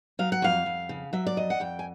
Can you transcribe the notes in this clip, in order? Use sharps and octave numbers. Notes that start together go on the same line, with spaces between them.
F#3 F5
F#5
F2 F5
F2
C#3
F#3 E5
D5
F2 D#5
F#5
F2 G5
G#5